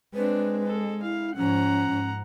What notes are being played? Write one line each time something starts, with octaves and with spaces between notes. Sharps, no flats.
G#3 C4 D4 B4
A4
E4 F5
G#2 F3 C#4 F#5 A#5
G#2